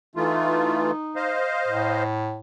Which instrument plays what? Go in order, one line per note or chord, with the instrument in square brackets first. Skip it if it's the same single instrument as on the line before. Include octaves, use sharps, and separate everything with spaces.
[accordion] E3 A3 F4 [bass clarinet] D#4
[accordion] C5 D#5 F5
[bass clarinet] A2